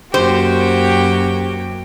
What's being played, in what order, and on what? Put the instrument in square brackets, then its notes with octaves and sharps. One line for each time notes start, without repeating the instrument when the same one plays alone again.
[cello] F#2 A#3 [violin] F#4 G5 [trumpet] G4 [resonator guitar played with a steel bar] C5